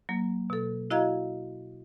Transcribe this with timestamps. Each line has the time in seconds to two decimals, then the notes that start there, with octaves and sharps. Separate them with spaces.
0.09 F#3 A#3
0.50 B2 A4
0.90 E4 F#4 D#5 F5 A#5 G#6